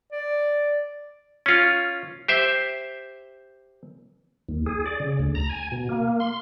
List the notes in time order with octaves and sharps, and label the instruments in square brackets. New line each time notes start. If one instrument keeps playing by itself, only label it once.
[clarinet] D5
[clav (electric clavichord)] C#4 F4
G4 C5 E5
[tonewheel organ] D#2
G#4
D5
C#3
D2
A#5
G#5
B2
A#3
C6